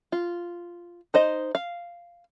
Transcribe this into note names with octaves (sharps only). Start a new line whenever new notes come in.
F4
D#4 C5 D#5
F5